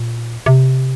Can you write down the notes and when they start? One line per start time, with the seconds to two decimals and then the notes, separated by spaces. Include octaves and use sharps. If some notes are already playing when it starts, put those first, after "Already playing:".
Already playing: A#2
0.46 C3